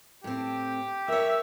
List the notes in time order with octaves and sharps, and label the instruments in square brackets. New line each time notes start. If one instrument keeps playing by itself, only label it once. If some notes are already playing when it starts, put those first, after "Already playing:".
[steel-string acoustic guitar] A2 C4 [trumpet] G4
[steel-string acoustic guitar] A#4 C#5 [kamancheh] E5